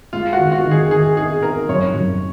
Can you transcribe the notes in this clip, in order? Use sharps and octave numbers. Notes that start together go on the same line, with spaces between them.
G#3 F4
F#4
D#3
F#4
D#3
G#4
D#3 G#4
D#4 G#4
D#4 A#4
F#2 C#5
F#2